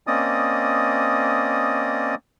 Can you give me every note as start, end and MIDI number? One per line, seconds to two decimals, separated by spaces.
0.07 2.15 58
0.07 2.15 60
0.07 2.15 61
0.07 2.15 74
0.07 2.15 75
0.07 2.15 87